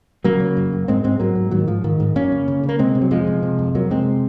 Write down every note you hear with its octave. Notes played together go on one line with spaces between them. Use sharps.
C#3 F#3 A#3
C#3
F#2
F#2
G#2 G#3 C4
G#2 G#3 C4
G#2 F#3 A#3
G#2
G#2 D#3 F#3
G#2 F3
G#2 D#3
G#2
F#2 A#3 C#4
C#3
C#3
C#3
A#3
C3 G#3 C4
C3
F#3
F2 F3 G#3
C3
C3
F2
F2 F#3 A#3
C3 G#3 C4